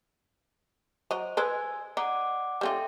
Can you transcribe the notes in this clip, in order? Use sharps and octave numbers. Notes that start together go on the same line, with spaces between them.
F#3 C5 D#5
B4 C5 D#5 G#5 E6 G#6
D#4 D5 F#5 D6
G3 C#4 F4 A4 E5 G5